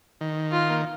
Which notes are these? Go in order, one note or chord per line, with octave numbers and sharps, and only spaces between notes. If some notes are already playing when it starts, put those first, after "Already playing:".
D#3
F4
A#3